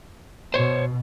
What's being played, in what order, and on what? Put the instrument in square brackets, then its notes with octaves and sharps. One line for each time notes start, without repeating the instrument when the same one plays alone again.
[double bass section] B2 [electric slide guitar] C5 C#5